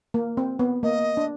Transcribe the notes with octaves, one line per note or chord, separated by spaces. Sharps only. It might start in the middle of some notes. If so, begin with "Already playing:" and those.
A#3
C4
B3
A#3 D#5
D4